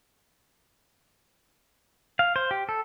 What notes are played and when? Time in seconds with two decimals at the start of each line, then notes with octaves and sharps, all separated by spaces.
2.19 F5
2.36 C5
2.51 G4
2.69 A4